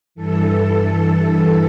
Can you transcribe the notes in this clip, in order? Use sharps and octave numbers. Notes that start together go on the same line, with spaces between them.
G2 E3 A4
A4